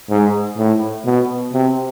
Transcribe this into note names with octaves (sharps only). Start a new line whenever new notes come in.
G#2
A2
B2
C3